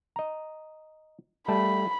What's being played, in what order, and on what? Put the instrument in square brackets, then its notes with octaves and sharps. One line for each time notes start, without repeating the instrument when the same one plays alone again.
[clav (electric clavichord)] D#5 A#5
[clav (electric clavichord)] G3 A3 A5 [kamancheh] B5